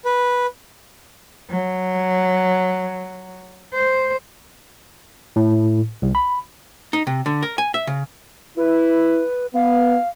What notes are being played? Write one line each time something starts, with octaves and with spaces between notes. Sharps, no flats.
B4
F#3
C5
A2
C2
B5
D#4
C3
D3
A#4
G#5
E5
C#3
E4 B4
B3 F5